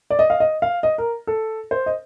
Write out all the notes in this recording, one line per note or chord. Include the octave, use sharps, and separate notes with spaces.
D5
D#5
F5
D#5
F5
D#5
A#4
A4
C5
D#5